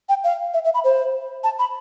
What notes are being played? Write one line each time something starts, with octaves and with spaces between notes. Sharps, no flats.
G5
F5
E5
E5
B5
C5
A5
B5